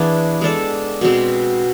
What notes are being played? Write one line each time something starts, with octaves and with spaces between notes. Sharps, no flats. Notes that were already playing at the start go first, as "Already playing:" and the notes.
Already playing: E3 B3 D4 G#4
G#3 D4 A4
B2 G#3 C4